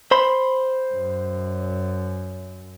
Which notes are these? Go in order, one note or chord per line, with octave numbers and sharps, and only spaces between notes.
C5 B5 C6
F#2